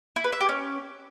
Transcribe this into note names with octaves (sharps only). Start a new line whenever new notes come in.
E4
B4
E5
G4
C#4